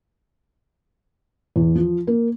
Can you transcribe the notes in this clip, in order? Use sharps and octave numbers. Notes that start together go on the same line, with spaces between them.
E2
F3
A#3